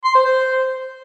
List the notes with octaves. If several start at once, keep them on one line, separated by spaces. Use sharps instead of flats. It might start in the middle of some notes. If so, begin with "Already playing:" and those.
C6
C5
C5